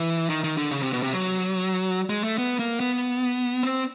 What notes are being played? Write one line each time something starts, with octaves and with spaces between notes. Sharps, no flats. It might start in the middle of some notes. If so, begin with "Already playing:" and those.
Already playing: E3
D#3
D#3
D3
C#3
C3
B2
C3
F#3
G#3
A3
B3
A#3
B3
C4